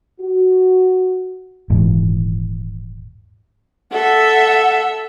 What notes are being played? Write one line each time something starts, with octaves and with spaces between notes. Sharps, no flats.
F#4
D#1 G#2 E3
A4 E5 F#5